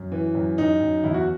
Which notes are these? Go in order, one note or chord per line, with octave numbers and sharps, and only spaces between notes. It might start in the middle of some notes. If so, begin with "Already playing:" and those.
Already playing: F#2
E3
F#2
F#2 D#4
F#2
E2 E4
F#4